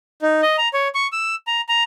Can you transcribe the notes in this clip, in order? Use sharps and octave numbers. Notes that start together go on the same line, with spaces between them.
D#4
D#5
A#5
C#5
C#6
E6
A#5
A#5